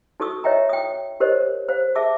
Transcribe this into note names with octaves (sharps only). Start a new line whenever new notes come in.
D#4 F#4 A4 C#6 D#6 E6
C#5 D#5 E5 G5 A#5
G5 D#6
G4 A#4 C5 C#5 D#5
C5 F5
G#4 E5 A5 D6 E6